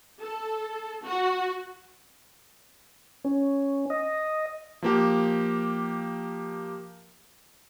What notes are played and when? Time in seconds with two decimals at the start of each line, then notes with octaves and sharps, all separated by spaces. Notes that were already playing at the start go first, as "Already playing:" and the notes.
0.20 A4
1.04 F#4
3.24 C#4
3.90 D#5
4.82 F3 A#3 G4